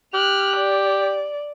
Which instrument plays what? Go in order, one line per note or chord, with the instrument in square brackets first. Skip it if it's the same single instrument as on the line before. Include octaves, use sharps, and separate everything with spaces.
[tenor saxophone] G4 [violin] F6 F#6
[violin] D5